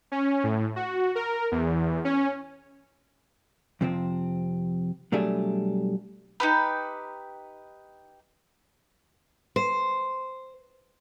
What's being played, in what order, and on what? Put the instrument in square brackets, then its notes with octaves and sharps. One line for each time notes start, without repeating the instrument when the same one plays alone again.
[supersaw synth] C#4
A2
F#4
A#4
E2
C#4
[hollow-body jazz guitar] F2 C3 F3 C4
B2 F#3 G3 A3 D4 G#4
[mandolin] D#4 G4 B4
[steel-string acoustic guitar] C5